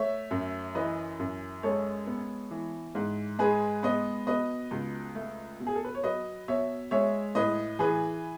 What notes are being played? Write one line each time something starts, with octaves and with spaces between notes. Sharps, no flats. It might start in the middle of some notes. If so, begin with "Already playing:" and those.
Already playing: A3 C#5 E5
F#2
E3 B4 D#5
F#2
G#3 A4 C#5
B3
E3
G#2
G#3 G#4 B4
B3 B4 D#5
B2 B4 D#5
C#2
A3
B2
G#4
A4
B4
C#5
F#3 B4 D#5
B2 C#5 E5
G#3 C#5 E5
A2 B4 D#5
E3 G#4 B4